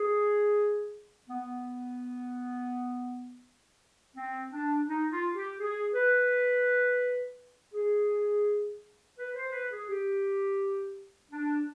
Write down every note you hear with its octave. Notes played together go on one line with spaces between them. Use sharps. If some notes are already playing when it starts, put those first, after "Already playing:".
Already playing: G#4
B3
C4
D4
D#4
F4
G4
G#4
B4
G#4
B4
C5
B4
G#4
G4
D4